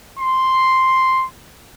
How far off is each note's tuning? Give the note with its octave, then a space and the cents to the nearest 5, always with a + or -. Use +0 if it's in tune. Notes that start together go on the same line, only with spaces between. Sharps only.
C6 +0